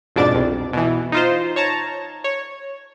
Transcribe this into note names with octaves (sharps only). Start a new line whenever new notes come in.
F2 G#2 B2 D4 D5 A6
C2 F2
B2 E3
D#4 F4 C5
C#5 A5 A#5
C#5